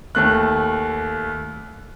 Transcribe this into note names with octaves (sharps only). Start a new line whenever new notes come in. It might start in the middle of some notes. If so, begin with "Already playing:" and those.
D#2 A3 F#6